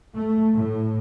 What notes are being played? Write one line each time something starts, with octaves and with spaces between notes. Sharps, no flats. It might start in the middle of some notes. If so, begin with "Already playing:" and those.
A3
A2